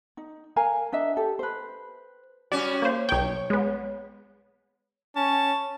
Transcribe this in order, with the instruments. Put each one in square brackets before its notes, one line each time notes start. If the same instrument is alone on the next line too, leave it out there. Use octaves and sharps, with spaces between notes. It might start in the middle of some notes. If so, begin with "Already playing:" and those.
[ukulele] D#4
A#4 F5 G#5 A#5
D4 D#5 E5
G4 A4
B4 C5
[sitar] G3 C#4 F#4 [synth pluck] D5
[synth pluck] A#3 C5
[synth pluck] B1 G5 [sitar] C#5
[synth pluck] G#3 B3
[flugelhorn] C#4 [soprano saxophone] A5